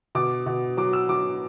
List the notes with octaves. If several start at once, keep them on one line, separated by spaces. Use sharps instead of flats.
B2 D6
B2
F#3 D6
E6
F#3 D6